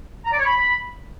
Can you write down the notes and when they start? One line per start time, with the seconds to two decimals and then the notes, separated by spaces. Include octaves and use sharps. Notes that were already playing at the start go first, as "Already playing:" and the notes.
0.25 A#5
0.32 D5
0.39 C#5
0.46 B5